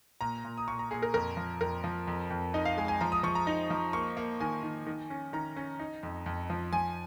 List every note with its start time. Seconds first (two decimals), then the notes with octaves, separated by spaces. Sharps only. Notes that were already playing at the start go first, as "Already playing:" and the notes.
0.21 A#2 A#5
0.45 A#2
0.57 D#6
0.68 A#2 C#6
0.79 A#5
0.91 A#2 G#4
1.02 A#4
1.14 F2 A#4
1.37 F3
1.61 F2 A#4
1.84 F3
2.07 F2
2.30 F2
2.54 D#4 D#5
2.65 F5
2.77 G#3 G#5
2.88 G#5
3.01 F3 A#5
3.12 D#6
3.23 F3 C#6
3.35 A#5
3.47 D#4
3.70 F3
3.93 A#3 C#6
4.17 A#3
4.40 D#3 G#5
4.63 D#3
4.86 D#3
5.10 C#4
5.33 D#3 A#5
5.56 C#4
5.79 D#4
6.03 F2
6.26 F2
6.50 F3
6.73 F3 G#5